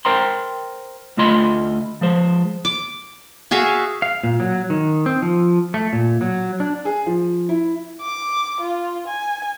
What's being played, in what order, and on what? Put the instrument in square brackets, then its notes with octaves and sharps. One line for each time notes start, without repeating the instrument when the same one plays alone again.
[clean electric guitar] A#4 C5 G5 A#5 C6
D2 A3 F4 D#5 B5 C6
F3 G#3 C5
[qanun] D6
F#4 G#4 E5 F5
[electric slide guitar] F5
A#2
F#3
D#3
C4
F3
A3
A#2
F#3
D4
[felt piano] G#4
F3
E4
[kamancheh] D6
F4
G#5